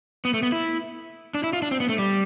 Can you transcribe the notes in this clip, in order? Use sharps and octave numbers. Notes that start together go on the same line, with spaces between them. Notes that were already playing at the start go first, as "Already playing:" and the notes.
B3
A3
B3
E4
D4
E4
F4
D4
C4
B3
A3
G3